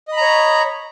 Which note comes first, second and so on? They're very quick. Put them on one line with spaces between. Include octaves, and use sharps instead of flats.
D#5 B5 A#5 C#5